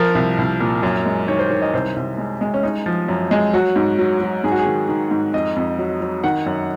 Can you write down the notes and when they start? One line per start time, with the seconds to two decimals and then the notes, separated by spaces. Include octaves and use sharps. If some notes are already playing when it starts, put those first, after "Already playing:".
Already playing: F3 A#4
0.15 C2
0.39 C2
0.60 A#2
0.83 F#2
1.06 G#3
1.28 D#3 C#5
1.39 C5
1.50 D#3 C#5
1.62 D#5
1.74 C2 C5
1.96 C2
2.18 G#3
2.41 G#3
2.54 C#4
2.63 G#3 D#4
2.86 F3
3.08 F#2
3.31 G#3
3.53 F#3 F#4
3.76 G#2
3.99 F#3
4.21 F#3
4.44 G#2 G#4
4.51 F#4
4.59 G#4
4.67 D#3
4.89 D#3
5.11 G#2
5.33 F2 D#5
5.56 F2
5.79 F#3
6.01 F#3
6.24 D#3 F#5
6.46 F#2